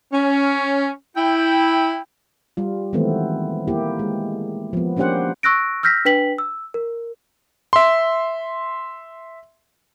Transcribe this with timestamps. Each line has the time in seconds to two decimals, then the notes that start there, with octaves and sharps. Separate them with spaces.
0.13 C#4
1.16 E4 G5
2.57 G3 F4
2.93 D#3 E3 G#3 A3 B3 C4
3.68 A#3 E4 G4
3.99 G#3
4.73 F3 B3
4.97 A#3 C#4 D4 G4 C5 F#5
5.43 C#6 E6 F#6 A#6 D7
5.83 E6 F6 G6 A#6 B6
6.05 D4 B4 G5 B6 F#7
6.38 E6
6.74 A#4
7.73 E5 C6